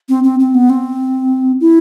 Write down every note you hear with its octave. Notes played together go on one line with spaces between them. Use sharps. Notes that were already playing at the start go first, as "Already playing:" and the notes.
C4
C4
C4
B3
C4
E4